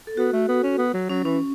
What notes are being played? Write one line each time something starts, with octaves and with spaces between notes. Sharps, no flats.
A4
B3 F#4
A3
B3
C#4
B3
F#3
F#3 C#4
E3 C#4